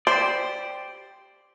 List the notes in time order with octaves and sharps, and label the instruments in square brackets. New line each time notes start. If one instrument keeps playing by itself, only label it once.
[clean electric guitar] G4 D5 [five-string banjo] C5